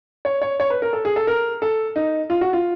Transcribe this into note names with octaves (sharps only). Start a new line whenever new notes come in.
C#5
C#5
C#5
B4
A#4
A4
G#4
A4
A#4
A4
D#4
F4
F#4
F4